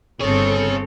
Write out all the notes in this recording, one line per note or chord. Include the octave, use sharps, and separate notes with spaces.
G1 C4 G#4 A4 C#5